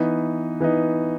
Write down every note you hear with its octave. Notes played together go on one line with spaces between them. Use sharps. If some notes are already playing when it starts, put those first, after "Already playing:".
Already playing: E3 B3 D#4
E3 B3 D#4